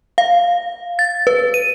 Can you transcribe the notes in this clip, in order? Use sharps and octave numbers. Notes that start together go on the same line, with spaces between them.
F5
A6
B4
D#7